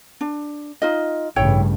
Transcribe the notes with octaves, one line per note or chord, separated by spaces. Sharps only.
D4
D#4 F4 D#5
A1 G2 C#3 E4 C#5 G5